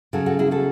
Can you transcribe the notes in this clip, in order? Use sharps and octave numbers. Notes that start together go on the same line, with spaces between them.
C#3 F#3 F#4 A4
F#4 A4
E4 G#4
F#4 A4